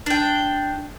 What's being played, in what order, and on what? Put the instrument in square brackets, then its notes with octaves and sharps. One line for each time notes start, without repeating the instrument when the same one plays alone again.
[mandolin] D4 G5